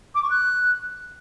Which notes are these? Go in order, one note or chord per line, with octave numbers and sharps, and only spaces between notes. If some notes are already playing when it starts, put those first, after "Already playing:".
D6
C#6
F#6